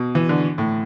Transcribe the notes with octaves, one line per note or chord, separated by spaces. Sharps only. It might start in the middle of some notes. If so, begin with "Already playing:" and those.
Already playing: B2
E3
D3
A2